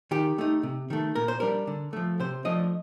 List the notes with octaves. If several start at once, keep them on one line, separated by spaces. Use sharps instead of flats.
D#3 G4
A3 D#4
C3
D#3 A3
A#2 A#4
C5
G3 D4 A#4
D3
F3 A3
C3 C5
F3 A3 D4 D#5